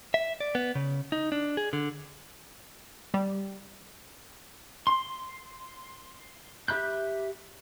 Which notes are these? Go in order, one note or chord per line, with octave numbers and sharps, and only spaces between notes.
E5
D5
B3
C#3
D#4
D4
G#4
D3
G3
C6
G4 E5 B5 F#6 G6